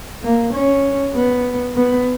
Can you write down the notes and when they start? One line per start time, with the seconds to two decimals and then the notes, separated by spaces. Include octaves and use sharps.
0.23 A#3
0.54 C#4
1.15 B3
1.76 B3